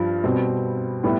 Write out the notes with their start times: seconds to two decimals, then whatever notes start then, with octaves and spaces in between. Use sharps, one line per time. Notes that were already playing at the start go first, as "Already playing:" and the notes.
Already playing: G2 F3
0.24 B2 G3 C4
1.03 A2 G3 B3